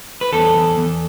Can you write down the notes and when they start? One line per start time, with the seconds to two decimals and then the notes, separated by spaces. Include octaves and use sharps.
0.21 B4
0.33 E2 A4
0.55 E2
0.78 E2